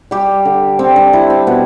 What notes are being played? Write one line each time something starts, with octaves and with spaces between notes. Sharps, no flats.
G3 G4
D3
G3 C4
D4
G3 E4
C4
B2 B3